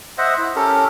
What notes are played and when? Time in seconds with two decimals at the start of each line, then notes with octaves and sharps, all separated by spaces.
0.18 C5 D#5 E5 F#5
0.38 E4
0.55 C#4 G4 A4 A#4